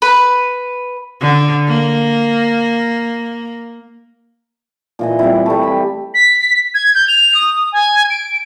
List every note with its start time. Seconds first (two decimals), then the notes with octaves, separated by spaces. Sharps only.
0.02 B4
1.21 D3
1.68 A#3
4.99 A#2 E3 D#5
5.19 G3 C4 E4
5.46 G3 A3
5.63 B5
6.14 B6
6.74 G#6
6.95 G6
7.08 F7
7.35 D#6
7.72 G#5
8.10 D7